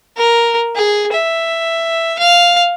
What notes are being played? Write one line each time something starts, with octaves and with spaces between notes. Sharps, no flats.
A#4
G#4
E5
F5